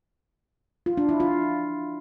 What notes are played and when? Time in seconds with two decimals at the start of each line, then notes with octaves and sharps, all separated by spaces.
0.86 F4
0.97 D4
1.09 E4
1.20 F4